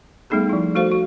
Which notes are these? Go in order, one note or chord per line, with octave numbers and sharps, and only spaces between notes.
G3 A3 B3 D#4 G#4 A4
F3 E4
A3 F#4 A4 C5 F5
F#4